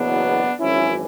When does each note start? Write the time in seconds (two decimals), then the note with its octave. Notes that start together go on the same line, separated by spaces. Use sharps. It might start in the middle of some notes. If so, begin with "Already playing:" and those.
Already playing: F#1 E2 B2 F#3 B3 D4
0.60 G#1 F#2 E3 C#4 E4